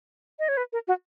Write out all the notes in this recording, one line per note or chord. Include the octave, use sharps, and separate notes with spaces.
D#5
C#5
B4
A#4
F#4